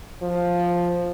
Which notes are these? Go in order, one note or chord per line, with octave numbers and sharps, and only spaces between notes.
F3